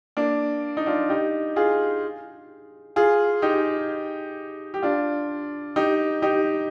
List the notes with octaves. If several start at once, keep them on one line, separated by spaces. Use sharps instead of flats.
A#3 D4
D#4
D4 F4
D#4 G4
F4 G#4
F4 G#4
D#4 G4
G4
D4 F4
D#4 G4
D#4 G4